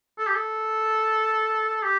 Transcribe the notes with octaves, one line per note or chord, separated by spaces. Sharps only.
A4
G4
A4
G4